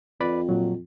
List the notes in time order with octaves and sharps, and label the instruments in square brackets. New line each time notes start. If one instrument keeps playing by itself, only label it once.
[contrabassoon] F2 [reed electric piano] B4 D5 B5
[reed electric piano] A#2 F#3